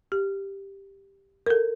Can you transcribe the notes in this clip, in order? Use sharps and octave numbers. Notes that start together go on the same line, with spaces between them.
G4
A#4
A4